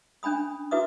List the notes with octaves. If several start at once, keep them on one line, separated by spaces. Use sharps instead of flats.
C#4 D4 G#5 B5 D#6
E4 F#4 B4 E5 D6 D#6